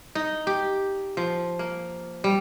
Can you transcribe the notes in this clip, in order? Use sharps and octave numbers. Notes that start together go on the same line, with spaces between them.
D#4
G4
F3
A#3
G3